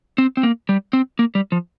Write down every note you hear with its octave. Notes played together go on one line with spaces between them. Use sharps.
C4
C4
A#3
G3
C4
A#3
G3
F3